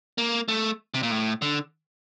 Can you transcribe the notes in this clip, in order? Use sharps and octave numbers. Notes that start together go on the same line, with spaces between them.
A#3
A3
C3
A#2
A2
D3